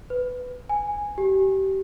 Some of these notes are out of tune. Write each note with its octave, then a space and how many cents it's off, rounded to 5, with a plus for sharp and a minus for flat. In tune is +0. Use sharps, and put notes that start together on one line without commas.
B4 +15
G#5 -10
G4 -30